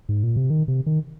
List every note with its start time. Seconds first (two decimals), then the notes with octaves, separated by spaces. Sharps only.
0.09 G#2
0.23 A#2
0.36 C3
0.50 D#3
0.68 C3
0.86 D#3